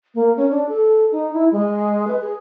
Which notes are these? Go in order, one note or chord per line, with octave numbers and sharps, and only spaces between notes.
A#3
C#4
D4
A4
D#4
E4
G#3
B4
G#4